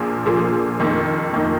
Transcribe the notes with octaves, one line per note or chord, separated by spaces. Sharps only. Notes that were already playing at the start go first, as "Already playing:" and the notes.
Already playing: A#1 A#2 F3 A#3 G#4
A#1 A#2 F3 A#3 G#4
F2 D#3 A#3 D#4
F2 D#3 A#3 D#4